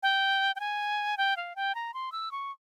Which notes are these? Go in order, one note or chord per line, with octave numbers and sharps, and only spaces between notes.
G5
G5
G#5
G5
F5
G5
A#5
C6
E6
C#6